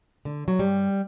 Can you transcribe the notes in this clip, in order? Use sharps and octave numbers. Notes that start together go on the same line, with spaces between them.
D3
F#3
G2 G3